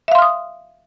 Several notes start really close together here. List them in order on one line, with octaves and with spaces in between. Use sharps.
E5 F5 C6 F6 D#6